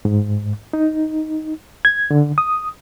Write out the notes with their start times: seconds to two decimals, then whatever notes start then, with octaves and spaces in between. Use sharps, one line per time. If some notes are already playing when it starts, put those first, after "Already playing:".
0.05 G#2
0.73 D#4
1.85 G#6
2.11 D3
2.38 D#6